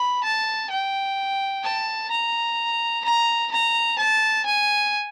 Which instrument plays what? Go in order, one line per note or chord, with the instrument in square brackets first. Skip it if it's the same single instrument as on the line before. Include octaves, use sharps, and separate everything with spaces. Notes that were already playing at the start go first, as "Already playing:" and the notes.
Already playing: [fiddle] B5
A5
G5
A5
A#5
A#5
A#5
A5
G#5